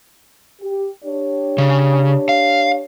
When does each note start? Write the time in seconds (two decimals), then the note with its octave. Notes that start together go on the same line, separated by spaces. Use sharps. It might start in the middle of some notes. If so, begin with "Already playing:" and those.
0.60 G4
1.03 D4 G4 C#5
1.58 C#3
2.29 F5